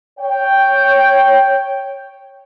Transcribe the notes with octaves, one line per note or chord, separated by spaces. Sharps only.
C#5 G5